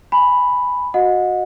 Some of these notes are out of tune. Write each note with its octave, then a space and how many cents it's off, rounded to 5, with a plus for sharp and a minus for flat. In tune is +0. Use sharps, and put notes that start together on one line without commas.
G#5 +0 B5 +0
F#4 -15 D#5 +0 F#5 -35